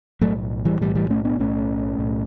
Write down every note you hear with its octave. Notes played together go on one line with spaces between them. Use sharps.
B1 A2 F#3 A3
E3 G3
B1 A2 E3 G3
E3 G3
A3 C#4
B3 D4
B1 A2 A3 C#4
B1 A2